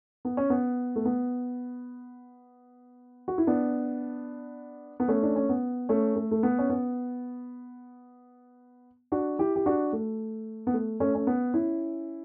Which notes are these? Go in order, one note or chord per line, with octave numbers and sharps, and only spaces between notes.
B3
C#4
B3
A3
B3
F#4
E4
B3 D4
B3
A3 C#4
D4
C#4
B3
A3 C#4
A3
A3
B3
C#4
B3
D4 F#4
E4 G4
G4
D4 F#4
A3
B3
A3
A3 C#4
C#4
B3
C#4 E4